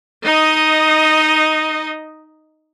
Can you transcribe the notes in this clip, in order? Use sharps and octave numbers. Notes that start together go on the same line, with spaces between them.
D#4 D#5